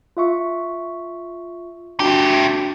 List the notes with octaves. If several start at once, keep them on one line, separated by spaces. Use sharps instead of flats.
F4 E5 C#6
A3 D4 F#4 G4 G5